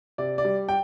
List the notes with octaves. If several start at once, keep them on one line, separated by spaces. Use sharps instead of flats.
C3 D5
D5
G3
G5